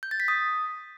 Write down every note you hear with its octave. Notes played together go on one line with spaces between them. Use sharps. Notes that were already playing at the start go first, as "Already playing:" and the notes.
G6
A6
B6
D#6